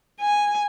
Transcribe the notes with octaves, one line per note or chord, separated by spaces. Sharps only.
G#5